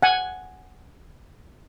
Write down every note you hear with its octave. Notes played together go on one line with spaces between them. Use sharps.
F#5 G#5